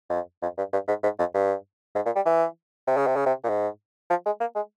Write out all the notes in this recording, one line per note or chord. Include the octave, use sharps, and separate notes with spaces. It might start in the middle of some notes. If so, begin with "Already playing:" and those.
F2
F2
G2
G2
G#2
G#2
F2
G2
G#2
A#2
G3
E3
C3
C#3
C3
C#3
C3
A#2
G#2
F3
G#3
A#3
G#3